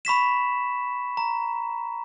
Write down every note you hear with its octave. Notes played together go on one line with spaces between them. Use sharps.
B5 C#6 B6 E7
A#5